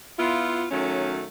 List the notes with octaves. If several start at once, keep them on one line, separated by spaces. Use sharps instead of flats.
B3 E4 F4
D#3 F#3 A3 C#4